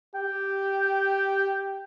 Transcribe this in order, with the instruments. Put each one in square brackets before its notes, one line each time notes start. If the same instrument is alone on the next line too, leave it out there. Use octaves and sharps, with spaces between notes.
[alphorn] G4 [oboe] G5